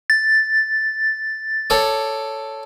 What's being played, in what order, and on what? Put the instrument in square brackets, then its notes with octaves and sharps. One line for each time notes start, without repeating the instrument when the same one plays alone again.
[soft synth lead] A6
[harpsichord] A4 C#5 D5